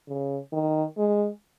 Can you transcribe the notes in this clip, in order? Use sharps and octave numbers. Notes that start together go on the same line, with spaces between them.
C#3
D#3
G#3